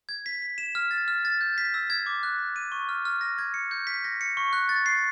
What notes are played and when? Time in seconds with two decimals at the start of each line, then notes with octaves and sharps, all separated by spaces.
0.09 G#6
0.26 B6
0.42 B6
0.58 E7
0.75 F6
0.91 A6
1.08 F6
1.25 A6
1.41 G6
1.58 B6
1.74 E6
1.90 G#6
2.06 D6
2.23 F#6
2.39 B6
2.56 D#7
2.72 C#6
2.89 F6
3.05 F6
3.21 A#6
3.38 G#6
3.54 C#7
3.71 G6
3.87 B6
4.04 A#6
4.21 C#7
4.37 C#6
4.53 F#6
4.69 A6
4.86 C7